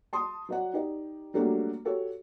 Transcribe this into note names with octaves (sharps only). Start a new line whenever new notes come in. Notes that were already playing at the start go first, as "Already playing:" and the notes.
A5 C6 D#6
F#3 D5 F#5
D#4 G4 D5
F#3 G3 A3 A#3 D4 F#4
F#4 G4 A4 C#5